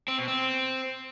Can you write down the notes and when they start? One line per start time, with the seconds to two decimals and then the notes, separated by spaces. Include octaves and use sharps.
0.08 C4
0.18 B2
0.28 C4